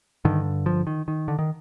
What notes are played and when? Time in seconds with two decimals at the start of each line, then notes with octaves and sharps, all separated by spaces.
0.25 G2 D3 D#3
0.66 F3
0.87 D#3
1.08 D#3
1.28 D3
1.39 D#3